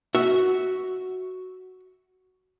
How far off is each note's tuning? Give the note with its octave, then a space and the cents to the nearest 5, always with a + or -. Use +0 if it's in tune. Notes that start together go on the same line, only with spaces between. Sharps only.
F#4 +5 E5 -10